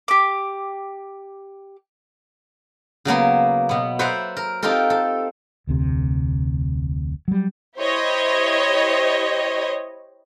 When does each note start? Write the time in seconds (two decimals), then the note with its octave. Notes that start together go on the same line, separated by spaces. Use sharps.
0.08 G4 D6
3.05 C#3 F#3 A#3 B3
3.69 B2 B3
3.99 B4 C5 D5 E5 F#5 A#5
4.37 A#4
4.62 C4 D#4 F4 G4 A4 A#4
4.90 A4
5.67 F1 D2 C3
7.28 F#3 G3
7.78 E4 G4 C5 C#5 D#5